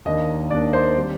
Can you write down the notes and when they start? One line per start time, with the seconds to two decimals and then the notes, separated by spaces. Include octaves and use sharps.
0.05 D#2 D#3 A#3 D4 D#5
0.50 D#2 D#3 A#3 D4 D5
0.73 C5
0.97 D#3 G3 C4